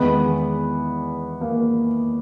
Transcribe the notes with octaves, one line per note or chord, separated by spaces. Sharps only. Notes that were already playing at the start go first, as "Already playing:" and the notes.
Already playing: E2 D#3 G#3 B3
A#3